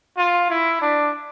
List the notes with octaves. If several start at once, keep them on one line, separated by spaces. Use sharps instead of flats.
F4
E4
D4